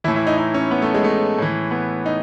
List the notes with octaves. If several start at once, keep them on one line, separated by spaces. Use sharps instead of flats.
A2 E3 E4
E4
D#4
D#4
C#4
B3
A3
G#3
A3
A2 E3
B3
D#4